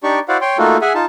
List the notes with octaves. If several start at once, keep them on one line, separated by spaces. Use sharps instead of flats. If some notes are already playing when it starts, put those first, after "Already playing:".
D4 D#4 G4 D5 C#6
E4 F#4 C5 D5 F5 F#5
C#5 G5 C6
A3 A#3 D#4 F4 F#4 A4
G#4 E5 F#5 G#5
D#4 F4 A5